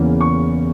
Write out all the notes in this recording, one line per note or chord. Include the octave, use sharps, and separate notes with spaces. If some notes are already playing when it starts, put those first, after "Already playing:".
Already playing: E2 C#3 E3 A#3 C#4
C#6